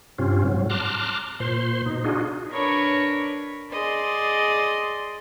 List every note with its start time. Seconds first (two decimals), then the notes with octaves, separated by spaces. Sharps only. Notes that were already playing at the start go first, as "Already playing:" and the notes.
0.18 G2 C3 C4 C#4 F4
0.44 G#2 F#3
0.70 A5 A#5 C6 D6 F6 F#6
1.40 A#2 C5 C6
1.86 B2 D#4
2.04 D4 D#4 F4 F#4 G#4
2.51 D4 A#4 B4 C#5 B5 C#6
3.71 G#4 D5 D#5 C6